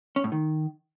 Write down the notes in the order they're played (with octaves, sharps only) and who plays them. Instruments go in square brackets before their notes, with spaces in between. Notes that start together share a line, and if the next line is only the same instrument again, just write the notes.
[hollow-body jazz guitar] C#4
A2
D#3